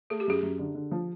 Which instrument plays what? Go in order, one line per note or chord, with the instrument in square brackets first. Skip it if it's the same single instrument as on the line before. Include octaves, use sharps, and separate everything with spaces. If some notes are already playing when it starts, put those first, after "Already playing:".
[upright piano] A3 [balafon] G#4
[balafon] G4
[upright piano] F#2 [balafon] G#4
[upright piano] F#2
D3
D3
F3